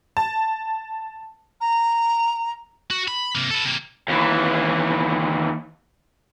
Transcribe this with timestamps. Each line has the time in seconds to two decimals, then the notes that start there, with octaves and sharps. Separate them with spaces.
0.17 A5
1.61 A#5
2.91 F#4
3.08 B5
3.35 C3 A#3
3.51 A4 B4
3.65 C3 A#3
4.08 D#2 E3